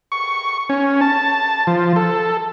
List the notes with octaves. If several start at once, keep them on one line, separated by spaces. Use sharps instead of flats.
C#6
C#4
A5
F3
A4